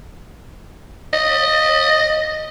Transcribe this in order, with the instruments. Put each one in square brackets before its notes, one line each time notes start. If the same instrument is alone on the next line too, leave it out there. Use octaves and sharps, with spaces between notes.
[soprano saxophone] D#5